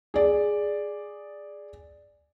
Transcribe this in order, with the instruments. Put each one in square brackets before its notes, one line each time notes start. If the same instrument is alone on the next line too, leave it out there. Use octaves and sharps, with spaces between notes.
[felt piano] G#4 D5